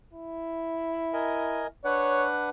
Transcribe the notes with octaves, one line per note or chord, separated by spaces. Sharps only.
E4
A#4 D#5 G#5
D4 B4 C#5 F#5